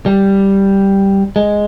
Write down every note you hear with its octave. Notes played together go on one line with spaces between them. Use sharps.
G3
G#3